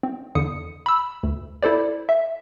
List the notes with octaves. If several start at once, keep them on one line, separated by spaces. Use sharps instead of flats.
C4
E2 D3 D#6 C#7
B5 E6
D2
E4 A4 C5 D5
E5